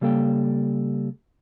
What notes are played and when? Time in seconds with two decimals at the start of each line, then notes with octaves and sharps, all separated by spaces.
0.01 C#3 G3 A#3 A4 C5 G5